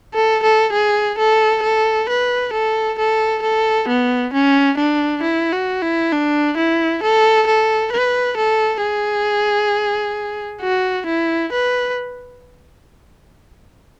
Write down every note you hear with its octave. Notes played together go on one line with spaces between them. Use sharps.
A4
A4
G#4
A4
A4
B4
A4
A4
A4
B3
C#4
D4
E4
F#4
E4
D4
E4
A4
A4
B4
A4
G#4
F#4
E4
B4